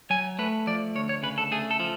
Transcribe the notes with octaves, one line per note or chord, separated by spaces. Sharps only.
F#3 G#5
A3 B4
F3 D5
D2 C#5
C#5
C#3 B4
A4
A3 G#4
A4
F3